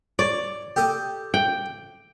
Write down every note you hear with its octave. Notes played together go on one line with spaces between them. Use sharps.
C#5 D5
G4 A4 D#6
G5